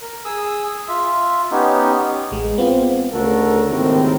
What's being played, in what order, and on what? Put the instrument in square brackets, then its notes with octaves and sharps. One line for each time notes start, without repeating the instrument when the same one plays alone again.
[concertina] A#4
G#4 D#6 E6
F4 E5
B3 C#4 D#4 G4
[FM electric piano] A1 G#3
B3 C4 F4
[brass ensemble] D2 C#3 F#4 A4 A#4
G#1 D#2 A2 C3 C4 A#4